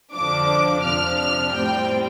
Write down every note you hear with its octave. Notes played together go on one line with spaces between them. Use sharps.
F2 D3 F3 D4 D6
F2 C3 F3 D4 F6
F6
A2 G3 C4 G5